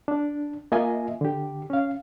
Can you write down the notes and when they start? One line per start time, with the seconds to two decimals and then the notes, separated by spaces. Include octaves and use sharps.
0.08 D4
0.72 A#3 F4 D#5 E5 G#5
1.21 D3 G4
1.70 C#4 F5